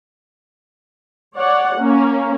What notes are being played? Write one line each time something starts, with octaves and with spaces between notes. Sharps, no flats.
C#5 D5 F#5
A#3 C#4